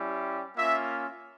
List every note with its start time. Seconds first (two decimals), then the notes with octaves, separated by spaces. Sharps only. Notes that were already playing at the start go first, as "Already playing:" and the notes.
Already playing: G3 C#4 E4 G4
0.56 A#3 C#4 F4 E5